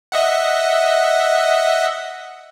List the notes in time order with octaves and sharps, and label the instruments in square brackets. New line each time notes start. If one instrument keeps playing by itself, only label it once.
[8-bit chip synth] D#5 E5 F#5